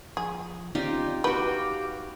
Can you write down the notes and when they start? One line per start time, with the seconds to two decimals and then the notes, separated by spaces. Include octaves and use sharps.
0.17 F3 G#4
0.75 C4 C#4 D#4 F4 G4 D5
1.24 F#4 G4 B4 F5 G5 D6